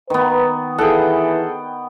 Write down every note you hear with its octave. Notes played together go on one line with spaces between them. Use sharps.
D#3 B3 B4
E3 G#4 A4 F#5 G5